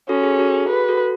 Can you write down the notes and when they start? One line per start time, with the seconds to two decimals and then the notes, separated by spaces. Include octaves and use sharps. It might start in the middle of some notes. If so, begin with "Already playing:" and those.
0.09 C#4 F#4 A4
0.23 G#4
0.39 F#4 A4
0.55 G#4
0.69 F#4 B4
0.88 F#4 A4